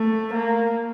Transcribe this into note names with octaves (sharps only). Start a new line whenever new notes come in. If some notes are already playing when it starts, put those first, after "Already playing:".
Already playing: A3
A#3